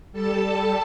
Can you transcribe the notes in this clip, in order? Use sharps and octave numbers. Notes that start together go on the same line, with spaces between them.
G3 A4 A5